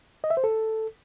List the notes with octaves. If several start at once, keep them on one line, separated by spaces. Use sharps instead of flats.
D#5
E5
C5
A4